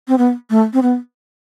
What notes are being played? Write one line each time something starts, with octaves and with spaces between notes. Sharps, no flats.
C4
B3
A3
C4
B3